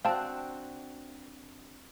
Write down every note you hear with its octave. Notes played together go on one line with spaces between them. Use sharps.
C4 D4 F#4 F5 G5 A5